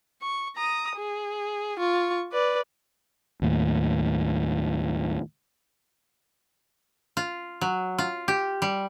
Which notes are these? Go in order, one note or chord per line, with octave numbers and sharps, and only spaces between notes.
C#6
A#5 D#6
G#4
F4 C#6
B4 D5
D#2 A2
F4
F#3
F4
G4
G3